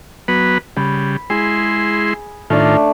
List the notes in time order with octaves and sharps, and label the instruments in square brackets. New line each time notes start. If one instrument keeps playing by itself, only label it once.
[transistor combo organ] F#3 B3 B4
[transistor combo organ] C#3 G3 [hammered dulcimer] B5
[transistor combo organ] G#3 E4 C6 [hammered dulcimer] G#4
[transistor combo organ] A2 D#3 F4 [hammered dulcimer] A3 D4